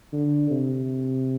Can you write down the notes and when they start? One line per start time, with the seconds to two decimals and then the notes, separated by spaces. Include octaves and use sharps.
0.13 D3
0.51 C3